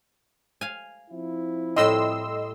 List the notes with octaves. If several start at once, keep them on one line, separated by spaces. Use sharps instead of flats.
F5 G#5
F3 C4 E4
A2 G3 D#5 C6 E6